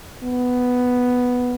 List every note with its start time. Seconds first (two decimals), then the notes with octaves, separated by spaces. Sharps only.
0.23 B3